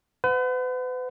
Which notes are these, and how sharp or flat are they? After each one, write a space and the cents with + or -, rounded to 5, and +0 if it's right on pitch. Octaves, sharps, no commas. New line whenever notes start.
B4 +40 F#5 -15